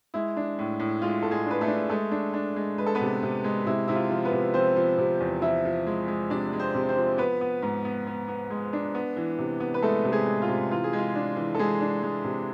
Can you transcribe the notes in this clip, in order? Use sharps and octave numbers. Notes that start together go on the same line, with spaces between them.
G#3 E4
D4
A2
A2
G#3 F4
A2 A4
G#3 G#4
D4 B4
A3 A4
D4
G#3 A3 A4
D4
D4
G#3
G#3 B4
A4
B3 B4
C3
C3
G#3
C3 E4
C3 E4
F4
F3
B3 B4
C3
F3 C4 C5
F3
C3
E2
F3 E4 E5
F3
G#3
G#3
C3 D4 D5
G#3
C4 C5
C3
C4 C5
F3
B3 B4
B3
G#2
B3
B3
B3
G#3
D4
B3
E3
C3
B3
B4
G#3 A3 A4
C3
G#3 G#4
G#3
F4
C3
E3 F4
G#4
G#3
F4
D4
E3
A4
E3 G#3 G#4
D4
G#3
C3